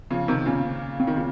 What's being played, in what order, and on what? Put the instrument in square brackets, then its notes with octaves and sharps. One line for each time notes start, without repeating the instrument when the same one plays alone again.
[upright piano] C#3 F3
C3 D#3
[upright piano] A#2 C#3 [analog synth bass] C#4
[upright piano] C#3 [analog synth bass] C4
[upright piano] D#3
A#2 C#3